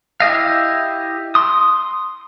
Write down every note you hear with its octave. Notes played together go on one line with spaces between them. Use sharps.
E4 G4 D#5 F5
C6 D#6